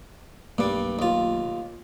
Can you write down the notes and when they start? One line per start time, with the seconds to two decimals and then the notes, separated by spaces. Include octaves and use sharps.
0.58 B1 G2 G3 A3 A#3
0.99 D#2 F4